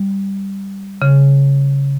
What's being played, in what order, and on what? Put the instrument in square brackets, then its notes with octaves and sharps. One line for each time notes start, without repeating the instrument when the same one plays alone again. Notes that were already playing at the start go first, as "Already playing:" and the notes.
Already playing: [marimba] G3
C#3